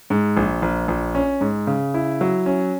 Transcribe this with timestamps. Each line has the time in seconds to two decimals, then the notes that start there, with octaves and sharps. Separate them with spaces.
0.10 G#2
0.37 A#1
0.62 A#1
0.88 A#1
1.15 C#4
1.41 G#2
1.67 C#3
1.94 E4
2.21 F#3
2.46 C#4